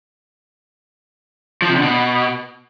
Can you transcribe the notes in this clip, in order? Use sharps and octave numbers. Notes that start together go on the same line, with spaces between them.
F3
C3
D3
B2